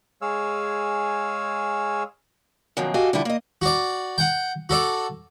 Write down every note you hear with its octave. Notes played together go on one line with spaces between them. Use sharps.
G#3 G#4 C#5 F5 E6
F#2 B2 D#3 F3
F#4 G4 A4 D#5 F5 G#5
D3 F3 G3 E4 F4
A#3 D#5
F#4 D5
F#5 G5
F#4 A4 D5